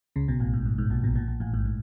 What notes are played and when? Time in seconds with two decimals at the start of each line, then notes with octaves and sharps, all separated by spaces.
0.16 C#2 C#3
0.28 B1 B2
0.40 A1 A2
0.53 G#2
0.65 G2
0.78 G#2
0.90 A#1 A#2
1.03 B1 B2
1.16 A#1 A#2
1.28 A#1 A#2
1.40 A1 A2
1.54 G#2
1.66 A2